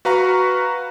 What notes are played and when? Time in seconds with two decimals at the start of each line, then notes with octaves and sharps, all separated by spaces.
0.05 F#4 B4 F5 A#5 C#6